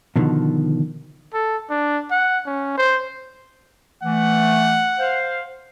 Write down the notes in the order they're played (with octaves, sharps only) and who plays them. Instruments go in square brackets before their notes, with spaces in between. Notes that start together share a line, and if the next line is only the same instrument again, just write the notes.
[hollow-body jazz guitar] B2 D3 D#3 F3
[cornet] A4
D4
F#5
C#4
C5
[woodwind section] E3 A3 [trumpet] F#5
[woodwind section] C5 F5